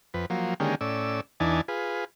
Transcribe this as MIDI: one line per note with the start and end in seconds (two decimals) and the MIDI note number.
0.14 0.26 41
0.14 0.26 71
0.30 0.54 53
0.30 0.54 54
0.30 0.54 58
0.60 0.75 50
0.60 0.75 51
0.60 0.75 56
0.60 0.75 58
0.60 0.75 61
0.60 0.75 67
0.81 1.21 45
0.81 1.21 61
0.81 1.21 74
0.81 1.21 88
1.40 1.61 40
1.40 1.61 52
1.40 1.61 62
1.40 1.61 63
1.40 1.61 80
1.40 1.61 81
1.68 2.05 65
1.68 2.05 68
1.68 2.05 71